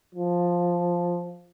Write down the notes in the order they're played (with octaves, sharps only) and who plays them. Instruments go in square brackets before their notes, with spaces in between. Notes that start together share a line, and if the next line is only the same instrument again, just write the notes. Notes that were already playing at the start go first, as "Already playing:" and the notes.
[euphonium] F3